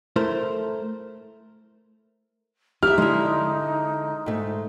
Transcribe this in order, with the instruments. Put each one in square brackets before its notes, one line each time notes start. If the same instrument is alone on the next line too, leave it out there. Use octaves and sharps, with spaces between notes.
[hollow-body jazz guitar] A3 E4 A#4 C5
[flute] D#4 [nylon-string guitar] E4 [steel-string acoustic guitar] G4 E5 [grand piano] F6
[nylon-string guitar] D3 E4 [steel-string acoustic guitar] G#3
[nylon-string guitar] G#2 A3